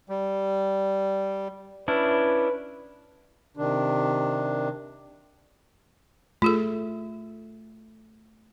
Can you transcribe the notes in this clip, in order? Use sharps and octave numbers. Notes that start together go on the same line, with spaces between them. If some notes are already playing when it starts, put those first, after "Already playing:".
G3
C#4 D4 E4 B4
C3 D#3 D4
A3 F4 G#4 A4